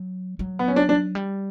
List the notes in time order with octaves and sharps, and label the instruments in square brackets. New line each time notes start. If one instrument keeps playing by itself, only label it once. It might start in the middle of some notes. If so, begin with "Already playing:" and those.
Already playing: [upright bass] F#3
F#3
[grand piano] B3
C#4
D4
D4
[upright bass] G3